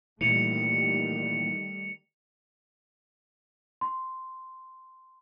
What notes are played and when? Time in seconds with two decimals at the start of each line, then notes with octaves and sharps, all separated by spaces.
0.21 A#2 D#3 E3 G3 A3 C#7 F7
3.81 C6